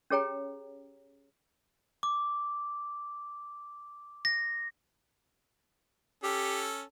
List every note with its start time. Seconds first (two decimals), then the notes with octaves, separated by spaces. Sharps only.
0.10 C#4 G4 G#4 C#5 G5 A#5
2.03 D6
4.25 A#6
6.24 C#4 G4 A4